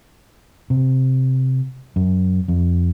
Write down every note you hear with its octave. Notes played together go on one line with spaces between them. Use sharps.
C3
F#2
F2